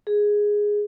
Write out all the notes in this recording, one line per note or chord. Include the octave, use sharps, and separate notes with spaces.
G#4